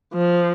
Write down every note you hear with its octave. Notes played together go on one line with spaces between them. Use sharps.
F3